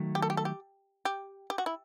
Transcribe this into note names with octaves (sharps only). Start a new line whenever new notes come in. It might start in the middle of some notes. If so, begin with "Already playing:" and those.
Already playing: D#3 F#3 A3
G4
A4
G4
A4
G4
G4
G4
F#4
E4